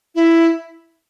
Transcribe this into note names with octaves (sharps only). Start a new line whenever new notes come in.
E4